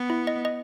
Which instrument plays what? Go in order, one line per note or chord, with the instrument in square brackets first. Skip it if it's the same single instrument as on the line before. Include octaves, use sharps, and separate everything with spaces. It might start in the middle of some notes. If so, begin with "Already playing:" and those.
Already playing: [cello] B3
[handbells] E4
D#5
D#5